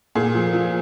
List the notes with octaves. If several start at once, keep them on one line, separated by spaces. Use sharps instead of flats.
A#2 G#4
F3
F3